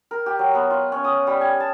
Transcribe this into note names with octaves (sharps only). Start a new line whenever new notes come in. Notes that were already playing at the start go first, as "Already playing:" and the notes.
A#4
G4
F#3
B3
F4
C#4
D#6
G3
G#5
A5